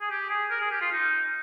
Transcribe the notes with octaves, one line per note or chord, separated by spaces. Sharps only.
G#4
G4
G#4
A#4
G#4
G4
F4
D#4